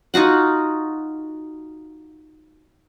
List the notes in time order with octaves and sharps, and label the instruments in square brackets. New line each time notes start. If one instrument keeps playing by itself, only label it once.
[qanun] D#4 F4 F#4 F#5